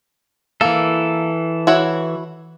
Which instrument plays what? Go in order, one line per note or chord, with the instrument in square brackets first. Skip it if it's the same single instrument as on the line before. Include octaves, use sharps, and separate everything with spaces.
[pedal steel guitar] E3 A4 [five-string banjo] A#3
[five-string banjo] E4 F#4 C#5